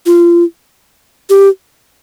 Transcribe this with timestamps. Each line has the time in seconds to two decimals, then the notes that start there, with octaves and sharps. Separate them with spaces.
0.06 F4
1.30 G4